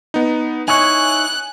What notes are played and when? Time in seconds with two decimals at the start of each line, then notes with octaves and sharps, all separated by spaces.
0.14 B3 D#4
0.68 D#4 E4 C#5 G#5 F#6